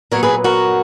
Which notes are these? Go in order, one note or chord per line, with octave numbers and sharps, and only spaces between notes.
A#2 F#3 B3 A#4 C#5
G#4 B4
F#4 A#4